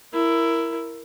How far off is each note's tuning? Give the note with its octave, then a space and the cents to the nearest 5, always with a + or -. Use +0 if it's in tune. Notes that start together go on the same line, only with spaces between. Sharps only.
E4 +10 A#4 +0